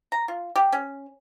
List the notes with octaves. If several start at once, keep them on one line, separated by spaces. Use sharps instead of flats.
A#5
F4
G4
C#4